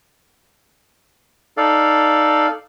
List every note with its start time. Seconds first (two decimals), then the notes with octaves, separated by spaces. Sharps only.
1.57 D#4 A4 D5 F5